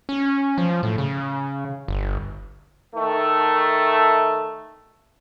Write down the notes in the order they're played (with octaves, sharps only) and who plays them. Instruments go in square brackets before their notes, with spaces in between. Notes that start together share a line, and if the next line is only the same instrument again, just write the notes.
[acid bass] C#4
F3
A2
C#3
G1
[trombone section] D#3 A3